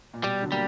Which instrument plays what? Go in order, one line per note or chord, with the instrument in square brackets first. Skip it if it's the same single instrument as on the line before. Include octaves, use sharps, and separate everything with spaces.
[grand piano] A#2
[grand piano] B2 [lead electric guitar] G3
[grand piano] D3 F#3
[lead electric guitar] G3 [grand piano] A#3